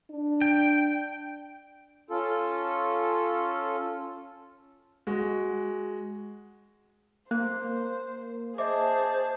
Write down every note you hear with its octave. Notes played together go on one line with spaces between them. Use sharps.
D4
G5
C#4 F4 A4
G#3 F#4
A#3 C5 F#6
G#4 C5 D#5 E5 A5 D6